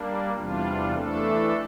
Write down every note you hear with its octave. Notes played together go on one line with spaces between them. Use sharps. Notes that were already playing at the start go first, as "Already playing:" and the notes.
Already playing: G3 A#3 D4
E2 C3 G3 D4 F4
E3 A3 D4 A4